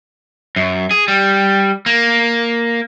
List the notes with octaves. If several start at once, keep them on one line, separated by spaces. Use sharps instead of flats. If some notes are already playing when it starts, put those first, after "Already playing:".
F#2
G#4
G3
A#3